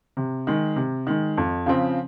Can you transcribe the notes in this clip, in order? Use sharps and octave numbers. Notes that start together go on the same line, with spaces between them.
C3
D#3 G#3
C3
D#3 G#3
F2
C#3 F3 C4